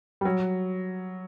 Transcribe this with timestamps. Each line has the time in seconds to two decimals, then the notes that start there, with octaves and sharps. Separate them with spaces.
0.21 G3
0.25 F#3